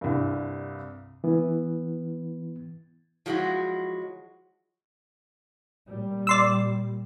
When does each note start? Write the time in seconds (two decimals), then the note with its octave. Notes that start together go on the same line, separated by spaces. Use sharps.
0.01 C2 G2
1.24 E3 B3
3.26 F3 F#3 G#3 E4 F#4
5.87 A#2 G3
6.27 D5 C6 E6